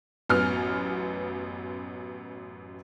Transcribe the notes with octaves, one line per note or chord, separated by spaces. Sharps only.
A1 F#2 B3 F6